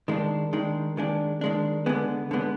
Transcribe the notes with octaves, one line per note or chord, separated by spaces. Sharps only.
D#3 G#3 D4
D#3 G#3 D4
D#3 G#3 D4
D#3 G#3 D4
D3 G#3 B3
D3 G#3 B3